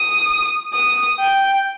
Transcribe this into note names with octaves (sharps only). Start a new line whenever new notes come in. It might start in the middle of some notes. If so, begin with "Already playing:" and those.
Already playing: D#6
D#6
G5